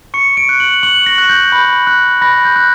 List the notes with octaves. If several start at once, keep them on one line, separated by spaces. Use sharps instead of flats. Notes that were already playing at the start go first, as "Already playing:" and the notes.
C#6 C#7
D7
F#6
F#7
C#6 F#7
A#6
F#6
G6
B5
F#6
B5 A#6
G6
F#6